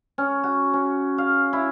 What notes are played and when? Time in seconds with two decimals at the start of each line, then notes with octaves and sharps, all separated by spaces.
0.18 C#4
0.43 F#4
0.73 C#4
1.18 F5
1.53 E4